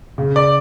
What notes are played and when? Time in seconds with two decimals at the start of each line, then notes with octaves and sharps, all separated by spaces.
0.18 C#3
0.36 D5